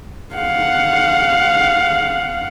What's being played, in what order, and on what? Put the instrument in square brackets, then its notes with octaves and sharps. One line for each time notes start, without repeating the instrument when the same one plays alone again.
[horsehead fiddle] F5 F#5